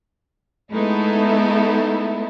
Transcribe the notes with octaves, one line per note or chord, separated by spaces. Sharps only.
G#3 A3 B3 D#4 E4 A4